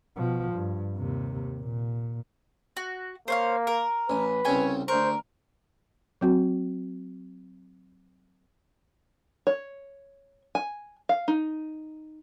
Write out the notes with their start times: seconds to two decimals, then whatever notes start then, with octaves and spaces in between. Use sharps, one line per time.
0.17 B2 F3
0.53 G2
0.97 D#2 C3
1.61 A#2
2.77 F#4
3.28 A#3 C5 C#5 F5
3.67 A#4
4.10 A1 B4 G#5
4.45 C2 C#3 C#5 G5 G#5
4.88 D2 A#4 C5 C#6
6.21 F#3 C4 F#4
9.47 C#5
10.55 G#5
11.09 F5
11.28 D#4